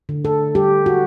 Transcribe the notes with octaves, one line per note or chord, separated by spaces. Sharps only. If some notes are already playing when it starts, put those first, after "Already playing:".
D3
A4
G3 G4
F#4